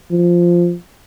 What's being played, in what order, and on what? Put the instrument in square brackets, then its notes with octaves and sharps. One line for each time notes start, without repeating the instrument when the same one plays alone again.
[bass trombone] F3